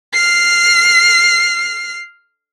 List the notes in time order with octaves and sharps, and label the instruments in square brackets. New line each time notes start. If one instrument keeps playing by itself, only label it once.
[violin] F6 C7